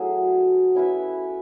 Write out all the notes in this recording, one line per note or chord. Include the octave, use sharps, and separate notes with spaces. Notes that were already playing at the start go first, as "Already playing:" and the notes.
Already playing: F#3 A3 E4 G#4
C#4 E4 B4 E5